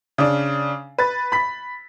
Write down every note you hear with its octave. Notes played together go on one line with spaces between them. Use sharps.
C#3 D4
B4 A6
B5 B6